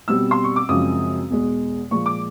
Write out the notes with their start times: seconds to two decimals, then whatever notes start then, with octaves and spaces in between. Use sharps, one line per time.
0.08 B2 G3 C4 E6
0.31 C6
0.44 C#6
0.56 D6
0.69 F#2 C#3 F3 G#3 C4 D#6
1.30 E2 B2 G#3
1.91 A#2 F3 G#3 C#6
2.06 D6